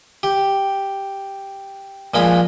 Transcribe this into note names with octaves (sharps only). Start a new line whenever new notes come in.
G4
A#2 F3 G#3 B5